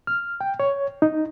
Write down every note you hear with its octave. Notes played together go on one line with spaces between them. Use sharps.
F6
G5
C#5
D#4